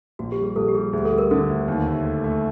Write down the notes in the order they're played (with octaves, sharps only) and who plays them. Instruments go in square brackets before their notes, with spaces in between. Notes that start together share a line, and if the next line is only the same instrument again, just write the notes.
[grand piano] A#1 [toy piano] F#4
[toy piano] G4
[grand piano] G3
[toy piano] G#4
[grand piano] A#1 [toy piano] A4
[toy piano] G4
[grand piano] G3 [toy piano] G#4
[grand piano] D2 [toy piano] G#4
[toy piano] A4
[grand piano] G3
[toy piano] A#4
[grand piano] D3 [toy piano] A4
[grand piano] D2
D#2
A3
A3
A3